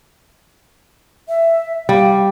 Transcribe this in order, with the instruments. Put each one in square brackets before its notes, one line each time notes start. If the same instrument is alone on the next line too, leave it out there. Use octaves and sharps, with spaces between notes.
[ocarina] E5
[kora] G3 [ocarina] F5